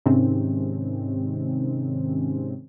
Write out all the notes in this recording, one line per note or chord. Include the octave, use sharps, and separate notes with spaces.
G#2 C3 D#3 C4 C#4